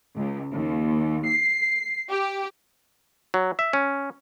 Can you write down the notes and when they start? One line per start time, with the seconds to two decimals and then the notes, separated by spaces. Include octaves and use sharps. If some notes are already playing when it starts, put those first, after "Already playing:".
0.15 C#2
0.52 D#2
1.25 C7
2.10 G4
3.34 F#3
3.59 E5
3.73 C#4